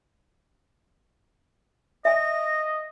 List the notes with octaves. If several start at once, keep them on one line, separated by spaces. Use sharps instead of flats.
D#5 E5 G#5 A#6